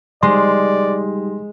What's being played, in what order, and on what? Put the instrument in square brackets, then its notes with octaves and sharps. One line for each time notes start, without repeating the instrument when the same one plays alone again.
[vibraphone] G3 D#4 G4 [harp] G#3 [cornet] D5 [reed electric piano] C6